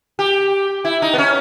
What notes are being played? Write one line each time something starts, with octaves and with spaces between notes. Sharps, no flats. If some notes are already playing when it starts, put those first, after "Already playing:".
G4
E4
D#4
B3
C#4